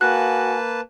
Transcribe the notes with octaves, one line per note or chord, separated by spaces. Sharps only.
A#3 F#4 G#4 B4 F5 G#5 A5 F#6